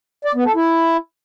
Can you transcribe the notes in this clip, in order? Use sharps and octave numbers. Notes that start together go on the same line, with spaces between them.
D5
B3
A4
E4